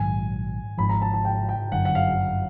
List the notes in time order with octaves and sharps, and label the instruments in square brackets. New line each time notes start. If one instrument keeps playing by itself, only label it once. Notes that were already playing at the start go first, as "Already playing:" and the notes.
Already playing: [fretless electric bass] A#1 G#2 D#3 F#3 [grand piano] G#5
[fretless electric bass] G#1 G#2 F3 [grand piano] B5
[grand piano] A#5
A5
A5
G5
G5
[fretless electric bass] G1 F#2 D3 [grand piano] F#5
[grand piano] F#5
F5